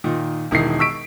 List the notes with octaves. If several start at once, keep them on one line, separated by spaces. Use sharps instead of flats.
A#2 D#3
E1 D#3 E4 C7
C#6 E6 B6 D7